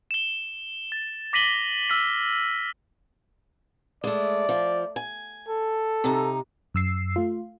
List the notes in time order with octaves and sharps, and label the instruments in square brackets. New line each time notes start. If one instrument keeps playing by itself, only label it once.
[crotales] E7 G7
A6
D6 A#6 B6 D#7 F#7 G7
E6 F6 B6
[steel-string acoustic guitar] G#3 A3 [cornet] D5
[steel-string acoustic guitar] F3
G#5
[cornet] A4
[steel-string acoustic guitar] C3 D#4
[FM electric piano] F#2 E6 C7
A3 F4